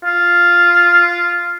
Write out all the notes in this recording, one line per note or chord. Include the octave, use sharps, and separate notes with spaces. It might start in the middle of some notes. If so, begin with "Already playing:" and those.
F4